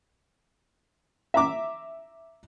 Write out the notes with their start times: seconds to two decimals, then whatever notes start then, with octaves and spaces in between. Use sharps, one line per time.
1.34 E5 A#5 D6